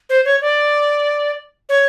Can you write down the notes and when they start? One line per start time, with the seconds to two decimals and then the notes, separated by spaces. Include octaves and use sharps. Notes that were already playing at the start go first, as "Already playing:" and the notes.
0.10 C5
0.25 C#5
0.41 D5
1.69 C#5